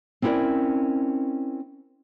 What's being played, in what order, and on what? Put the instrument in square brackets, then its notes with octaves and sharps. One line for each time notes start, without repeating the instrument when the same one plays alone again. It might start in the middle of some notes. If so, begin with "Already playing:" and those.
[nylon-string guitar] C4 C#4 E4 A4 A#4 D5